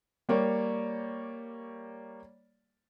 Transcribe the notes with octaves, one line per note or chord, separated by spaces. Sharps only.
G3 A#3 C#5 D5